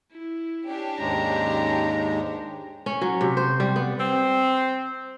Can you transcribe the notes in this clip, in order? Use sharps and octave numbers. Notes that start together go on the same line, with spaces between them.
E4
C#4 D4 G4
D#2 G#2 G#3 A#5
C#4
F#3
C3
C5
G3
B3
C4